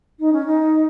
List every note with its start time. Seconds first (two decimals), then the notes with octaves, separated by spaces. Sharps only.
0.19 D#4
0.32 C#4
0.46 D#4